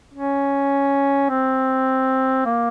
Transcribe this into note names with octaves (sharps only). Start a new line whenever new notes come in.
C#4
C4
A#3